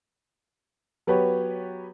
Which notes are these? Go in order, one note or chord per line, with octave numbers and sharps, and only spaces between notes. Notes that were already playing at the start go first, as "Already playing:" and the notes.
F#3 B3 G4 B4 C#5